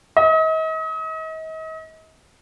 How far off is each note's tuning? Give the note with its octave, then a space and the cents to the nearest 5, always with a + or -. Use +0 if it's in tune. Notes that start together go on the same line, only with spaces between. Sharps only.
D#5 +40